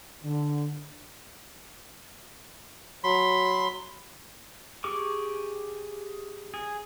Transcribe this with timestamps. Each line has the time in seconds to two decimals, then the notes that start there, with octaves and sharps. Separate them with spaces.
0.24 D3
3.04 F#3 B5 C6
4.84 G4 G#4 C#6 D6
6.54 G#4